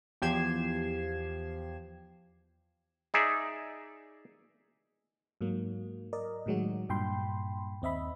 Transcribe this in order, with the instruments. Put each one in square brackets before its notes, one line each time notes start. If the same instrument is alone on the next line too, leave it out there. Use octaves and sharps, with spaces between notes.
[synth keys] E2 F3 G4 G#6 C7 E7
[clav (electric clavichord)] D#4 G#4 D5 E5
[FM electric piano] G#2 F#3 A#3
A#4 D5 D#5
A2 D#3 F#3 G#3 F#4
G2 A#2 G5 B5 C6
D#2 C4 D#5 E5 B5